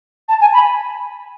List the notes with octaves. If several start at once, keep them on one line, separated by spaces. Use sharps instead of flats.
A5
G#5
B5